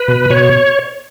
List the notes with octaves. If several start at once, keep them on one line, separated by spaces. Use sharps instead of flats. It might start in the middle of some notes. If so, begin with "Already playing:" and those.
Already playing: B4
B2
B2 C#5